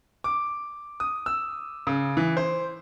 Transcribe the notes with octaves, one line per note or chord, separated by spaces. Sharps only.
D6
D#6
E6
C#3
E3
C5